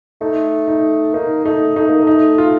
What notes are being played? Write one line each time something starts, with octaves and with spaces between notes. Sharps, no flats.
A3 D#4
D#4
A#3 D#4
A3 D#4
A3 D#4
A#3
A3 D#4
F4